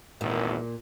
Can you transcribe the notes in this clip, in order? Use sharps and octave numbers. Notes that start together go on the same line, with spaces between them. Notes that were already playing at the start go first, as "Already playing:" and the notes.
G#1 E2 A#2